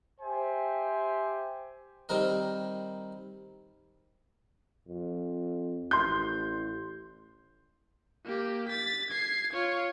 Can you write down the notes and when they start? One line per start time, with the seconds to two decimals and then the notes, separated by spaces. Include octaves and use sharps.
0.21 G4 C5 E5 G#5
2.09 D#3 G3 C4 A#4 D#5
4.88 F2
5.91 A1 C6 G6
8.25 A#3 G4
8.69 A6 B6
9.10 G#6 C7
9.53 F4 C#5